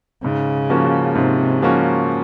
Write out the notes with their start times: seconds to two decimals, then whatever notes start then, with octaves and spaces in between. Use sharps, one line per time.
0.23 G#2 C#3
0.70 F3 A#3 C#4 F#4
1.15 G#2 C3
1.61 C#3 F3 A#3 C#4 F#4